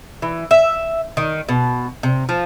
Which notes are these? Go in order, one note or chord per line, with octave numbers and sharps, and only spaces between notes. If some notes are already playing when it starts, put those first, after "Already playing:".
E3
E5
D#3
B2
C3
F3